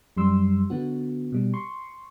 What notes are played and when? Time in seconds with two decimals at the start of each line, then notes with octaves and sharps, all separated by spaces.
0.17 F#2 G3 C6 E6
0.70 D3 B3 F#4
1.32 B2 G3
1.54 C6 C#6